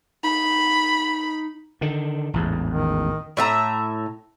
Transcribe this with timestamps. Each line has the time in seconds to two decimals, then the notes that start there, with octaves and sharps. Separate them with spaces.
0.23 D#4 B5
1.81 D3 D#3
2.33 A1 E2 G#2
2.69 D#3
3.37 A2 E5 A#5